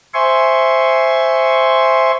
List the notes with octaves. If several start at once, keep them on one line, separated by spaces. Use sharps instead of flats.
C5 E5 G#5 C6 C#6